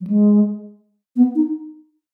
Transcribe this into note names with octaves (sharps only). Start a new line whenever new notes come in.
F#3
G#3
B3
D#4